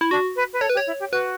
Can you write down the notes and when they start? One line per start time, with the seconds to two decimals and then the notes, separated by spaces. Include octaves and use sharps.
0.01 E4
0.11 D4 F#4
0.36 B4
0.53 B4
0.61 A4 C#5
0.70 B4
0.74 G4
0.77 C#5
0.87 E4
1.00 G4
1.12 F#4 B4